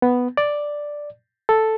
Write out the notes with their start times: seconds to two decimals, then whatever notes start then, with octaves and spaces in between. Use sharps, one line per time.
0.02 B3
0.37 D5
1.49 A4